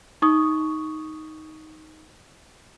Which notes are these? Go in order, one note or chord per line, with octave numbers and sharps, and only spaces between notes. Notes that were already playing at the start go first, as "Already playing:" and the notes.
D#4 C#6 D#6